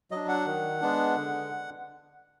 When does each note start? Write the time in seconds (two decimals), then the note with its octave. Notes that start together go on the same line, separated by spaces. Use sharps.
0.11 F#3 D4 D#5
0.28 F#5
0.46 D#3
0.81 G#3 B3 D4
1.16 D3